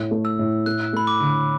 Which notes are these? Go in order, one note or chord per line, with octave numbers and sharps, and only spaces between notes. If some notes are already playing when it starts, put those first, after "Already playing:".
Already playing: A2
A3
E6
A2
A3 F#6
A3 B5
D6
D3